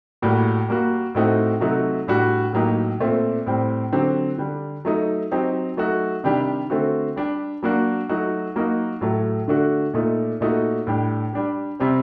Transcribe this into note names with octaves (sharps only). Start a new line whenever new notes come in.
A2 G3 A#3 F#4
G3 A#3 F#4
A2 A3 C4 D#4 F#4
C3 F#3 A3 D#4 F#4
A2 G3 D4 F#4
A2 F#3 A#3 D#4 G4
A#2 A3 C4
A2 G3 C4
D3 F#3 C4 G4
D3 G3 D4
F#3 A3 D#4
F#3 C4 D#4 G4
F#3 A3 D#4 F#4
C3 D#3 G3 D4 G4
D3 A3 C4 F#4
G3 D4 G4
F#3 A#3 D4 F#4
F#3 A3 D#4 F#4
F#3 A#3 D#4 F#4
A2 F#3 A3
D3 A3 D4 F#4
A#2 A3 D#4
A#2 A3 D#4 F#4
A2 G3 D4 G4
G3 D4 G4
C3 G3 C4